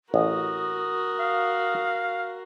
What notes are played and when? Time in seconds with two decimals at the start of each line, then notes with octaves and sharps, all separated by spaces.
0.14 A1 F#4 A#4 D#6
1.20 F5